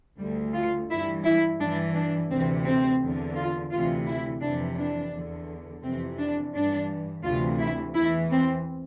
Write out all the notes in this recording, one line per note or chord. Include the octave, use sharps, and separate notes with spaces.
D2 D3 G3
F4
G2 E3 E4
E4
G2 E3 D4
D4
D2 C3 E3 C4
C4
E2 D3
F4
D2 C3 E3 F4
E4
F2 C3 E3 D4
D4
E2 D3
F2 C3 E3 C4
D4
G2 E3 D4
D2 C3 E3 F4
E4
E2 E3 E4
C4